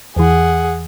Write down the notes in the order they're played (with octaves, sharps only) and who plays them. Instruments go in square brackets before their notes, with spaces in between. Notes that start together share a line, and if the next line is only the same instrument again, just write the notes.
[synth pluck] E2 E3 [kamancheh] G#4 F#5